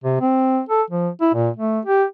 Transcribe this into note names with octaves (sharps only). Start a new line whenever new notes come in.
C3
C4
A4
F3
E4
A#2
A3
G4